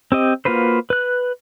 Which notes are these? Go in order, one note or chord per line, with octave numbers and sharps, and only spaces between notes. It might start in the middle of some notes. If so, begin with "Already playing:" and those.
C4 G4 D#5
A#3 F4 F#4 B4 C5
B4 F#6